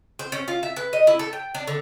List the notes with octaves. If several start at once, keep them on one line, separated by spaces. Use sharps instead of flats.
C5
C#4
F4
E5
B4
D#5
E4
A4
G5
D4
D3